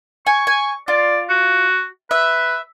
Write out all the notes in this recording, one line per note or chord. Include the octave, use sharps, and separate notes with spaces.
G#5 C#6
G#5
F4 D5
F#4
B4 E5